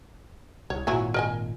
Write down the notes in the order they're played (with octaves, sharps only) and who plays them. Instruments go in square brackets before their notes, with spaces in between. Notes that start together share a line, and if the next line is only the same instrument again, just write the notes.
[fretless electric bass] C2 [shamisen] C#5
[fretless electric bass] G#1 A#2 [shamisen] F#3 E4 G#5
[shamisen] A#4 D#5 G#5